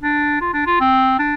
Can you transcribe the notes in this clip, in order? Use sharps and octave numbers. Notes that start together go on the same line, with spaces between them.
D4
F4
D4
F4
C4
D4